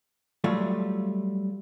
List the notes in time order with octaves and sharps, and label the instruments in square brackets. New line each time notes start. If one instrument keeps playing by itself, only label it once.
[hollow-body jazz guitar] F#3 G3 A3 F4